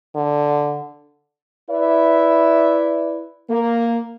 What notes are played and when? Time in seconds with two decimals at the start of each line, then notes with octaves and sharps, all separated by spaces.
0.15 D3
1.70 E4 B4 D5 E5
3.50 A#3